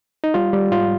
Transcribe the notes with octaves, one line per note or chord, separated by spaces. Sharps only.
D#4
G3 F4
G3
G#2 F4